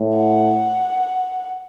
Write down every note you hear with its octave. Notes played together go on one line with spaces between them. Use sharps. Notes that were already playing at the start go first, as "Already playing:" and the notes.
Already playing: A2
F#5